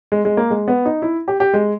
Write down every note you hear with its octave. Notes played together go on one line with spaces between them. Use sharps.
G#3
G#3
A#3
G#3
B3
D#4
E4
G4
G4
G#3